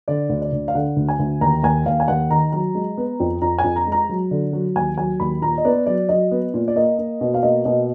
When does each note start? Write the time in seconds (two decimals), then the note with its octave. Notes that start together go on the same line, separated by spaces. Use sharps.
0.08 D3 D5
0.30 D2
0.42 D5
0.52 D2
0.68 F5
0.75 D3 F#5
0.97 D2
1.09 G#5
1.19 D2
1.41 D#2 A#5
1.63 D#2 G#5
1.86 D#2 F5
2.00 G#5
2.08 D#2 F#5
2.30 D#3 A#5
2.52 F#3 A#5
2.75 G#3
2.98 B3
3.20 F2
3.42 F2 A#5
3.59 G#5
3.64 F2
3.76 A#5
3.87 G#3
3.92 A#5
4.09 F#3
4.31 D3
4.53 F#3
4.76 D#2 G#5
4.97 F#3 G#5
5.20 D#2 B5
5.42 A#2 A#5
5.58 D#5
5.65 B3 D5
5.86 F#3 D5
6.09 F#3 D#5
6.31 B3
6.54 A#2
6.68 D5
6.76 A#3 D#5
6.98 A#3
7.21 B2
7.34 F5
7.43 A#3 D#5
7.65 B2 D#5